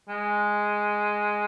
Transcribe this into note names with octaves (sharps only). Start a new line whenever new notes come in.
G#3